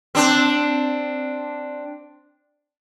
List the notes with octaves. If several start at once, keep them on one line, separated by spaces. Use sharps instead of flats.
C4 D4